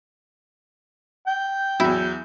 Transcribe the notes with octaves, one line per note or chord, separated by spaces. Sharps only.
G5 G6
E2 F#3 E4